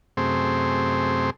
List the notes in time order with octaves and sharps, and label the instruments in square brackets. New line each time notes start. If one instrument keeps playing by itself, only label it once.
[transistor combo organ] F#2 C3 A3 C4 G#4 C5